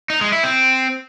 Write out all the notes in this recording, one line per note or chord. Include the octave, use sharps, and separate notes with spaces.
D#4
G#3
E4
C4